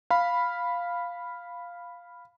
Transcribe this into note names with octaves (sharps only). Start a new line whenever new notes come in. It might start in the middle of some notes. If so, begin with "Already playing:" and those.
F5 B5